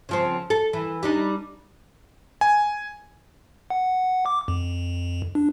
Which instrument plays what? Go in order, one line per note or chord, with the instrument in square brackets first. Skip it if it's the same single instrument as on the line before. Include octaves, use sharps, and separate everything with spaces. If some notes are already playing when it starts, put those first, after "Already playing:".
[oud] C#3 F3 C4
A4
E3
G3 D4 D#4
[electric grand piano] G#5
[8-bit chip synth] F#5
D6
F2
D4